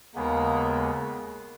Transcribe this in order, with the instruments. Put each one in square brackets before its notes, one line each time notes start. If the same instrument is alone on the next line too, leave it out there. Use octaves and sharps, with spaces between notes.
[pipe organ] D#2 C#3 G#3 B3 [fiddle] A#3